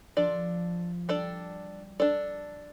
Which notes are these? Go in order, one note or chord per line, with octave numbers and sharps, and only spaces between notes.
F3 D4 A4 D5
G3 D4 A4 D5
D4 A4 D5